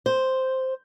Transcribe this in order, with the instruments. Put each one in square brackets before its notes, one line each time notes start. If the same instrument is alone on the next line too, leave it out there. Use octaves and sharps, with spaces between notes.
[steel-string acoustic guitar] C5